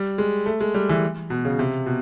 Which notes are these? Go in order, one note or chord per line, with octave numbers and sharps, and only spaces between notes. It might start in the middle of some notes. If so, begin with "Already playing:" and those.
Already playing: G3
G#3
A3
G#3
G3
E3
B2
C#3
C3
B2